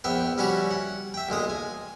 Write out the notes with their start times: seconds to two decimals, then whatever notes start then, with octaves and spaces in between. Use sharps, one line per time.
0.04 A#1 B3 E5 G5
0.38 G3 C#4 E4 F#4 G4
0.71 F#5
1.14 E5 G5
1.29 B1 A#2 G#3 D#6
1.50 G#5